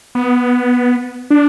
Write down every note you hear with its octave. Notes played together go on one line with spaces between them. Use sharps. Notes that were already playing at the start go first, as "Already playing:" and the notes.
B3
D4